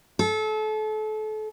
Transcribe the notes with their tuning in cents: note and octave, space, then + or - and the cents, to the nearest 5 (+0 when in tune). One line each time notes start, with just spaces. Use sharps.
A4 -30